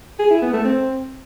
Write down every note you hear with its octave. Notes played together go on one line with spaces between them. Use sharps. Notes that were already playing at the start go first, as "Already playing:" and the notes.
G#4
E4
B3
A3
C4